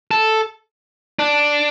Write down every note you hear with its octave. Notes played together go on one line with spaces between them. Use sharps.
A4
D4